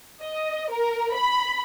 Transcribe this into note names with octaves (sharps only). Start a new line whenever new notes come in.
D#5
A#4
B5